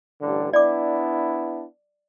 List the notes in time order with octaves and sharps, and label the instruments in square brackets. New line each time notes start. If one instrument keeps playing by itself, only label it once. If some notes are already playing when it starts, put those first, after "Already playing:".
[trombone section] A1 G2 D3
[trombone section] B3 D4 E4 [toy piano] D5 D6